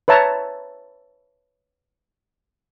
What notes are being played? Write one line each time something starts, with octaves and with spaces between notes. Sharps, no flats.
B4 C#5 E5 A5 A#5